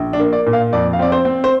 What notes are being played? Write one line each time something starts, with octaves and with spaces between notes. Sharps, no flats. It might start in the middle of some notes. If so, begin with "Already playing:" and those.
Already playing: A#1
D4
A#3
D5
A#2
F5
F2 D5
F5
C4 D5
C5
C4
C5